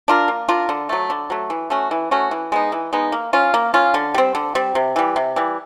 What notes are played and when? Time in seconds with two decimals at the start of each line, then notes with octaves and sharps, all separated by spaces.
0.08 D4 F4 A#4
0.28 A#3
0.48 D4 F4 A#4
0.69 D3
0.89 F#3 A3
1.10 D3
1.30 F#3 A3
1.50 E3
1.70 A3 C#4 F#4
1.91 E3
2.11 A3 C#4 F#4
2.31 E3
2.52 G#3 B3 D#4
2.72 E3
2.93 G#3 B3 D#4
3.12 A#3
3.33 C#4 F4
3.54 A#3
3.74 C#4 F4
3.94 D3
4.14 G3 C4
4.35 D3
4.55 G3 C4
4.75 C3
4.96 E3 G3
5.16 C3
5.36 E3 G3